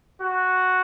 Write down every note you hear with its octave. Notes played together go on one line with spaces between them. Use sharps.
F#4